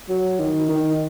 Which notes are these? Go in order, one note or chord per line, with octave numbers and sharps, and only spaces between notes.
F#3
D#3
D#3